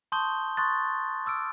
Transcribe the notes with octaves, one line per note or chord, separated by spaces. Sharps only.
A5 C6 C#6 D#6 G6 G7
C6 C#6 D#6 F#6 A6
D6 E6 F6 D7